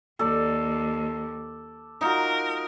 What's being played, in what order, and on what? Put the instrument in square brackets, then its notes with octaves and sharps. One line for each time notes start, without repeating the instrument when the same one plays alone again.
[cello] D#2 [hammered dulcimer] A4 D5
[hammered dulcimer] D#4 F4 F#4 [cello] A#4